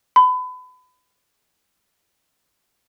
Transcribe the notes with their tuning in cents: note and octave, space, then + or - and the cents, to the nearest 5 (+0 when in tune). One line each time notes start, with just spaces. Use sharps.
B5 +30